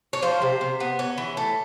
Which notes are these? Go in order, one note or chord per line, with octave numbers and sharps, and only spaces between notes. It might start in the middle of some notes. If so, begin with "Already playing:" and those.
C#5
F3 C5
C3
C3
B3
C#4
E3
A3